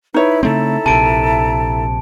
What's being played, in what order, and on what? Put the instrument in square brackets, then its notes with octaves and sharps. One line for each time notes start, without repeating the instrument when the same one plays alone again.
[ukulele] D#4 C#5 [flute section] E4 B4
[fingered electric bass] C#3 A3 C4 [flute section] E4 A4 A#5
[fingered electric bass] A#1 C3 [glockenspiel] A5 D7